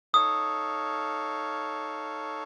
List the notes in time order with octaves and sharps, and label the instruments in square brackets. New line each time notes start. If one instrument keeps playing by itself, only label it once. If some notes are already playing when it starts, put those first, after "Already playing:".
[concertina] D#4 A4 C#5 F5 [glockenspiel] D#6